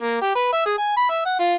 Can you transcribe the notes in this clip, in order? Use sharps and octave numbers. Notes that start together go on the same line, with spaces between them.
A#3
G4
B4
E5
G#4
G#5
B5
E5
F#5
F4